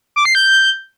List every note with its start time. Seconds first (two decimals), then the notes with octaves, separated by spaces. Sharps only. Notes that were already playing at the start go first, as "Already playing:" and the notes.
0.16 D6
0.25 C7
0.35 G6